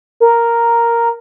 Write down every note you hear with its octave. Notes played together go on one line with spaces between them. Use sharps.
A#4